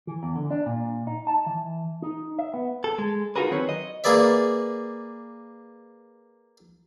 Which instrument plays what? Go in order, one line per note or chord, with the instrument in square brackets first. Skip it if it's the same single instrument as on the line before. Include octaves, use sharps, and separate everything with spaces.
[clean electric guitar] E3
E2
D3
D4
A#2
D#4
A5
E3
D#4
E5
B3
A4
G#3
D#4 F4 F#4 G#4 A#4 B4
D#3 F#3 C4 B4 C#5
D#5
[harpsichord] A#3 G#4 B4 D5 E5